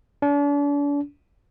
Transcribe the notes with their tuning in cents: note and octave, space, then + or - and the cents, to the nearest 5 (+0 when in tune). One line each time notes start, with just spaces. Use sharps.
D4 -40